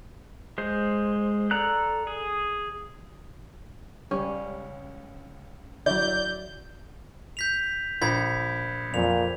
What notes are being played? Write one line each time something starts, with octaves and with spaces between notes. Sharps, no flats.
G#3 C5
A4 D5 A#5 F#6
G#4
C#2 G3 C#4
D3 F#3 E4 D5 G6
G6 B6 F7
A#1 B5 G#6 B6
F2 A#2 F7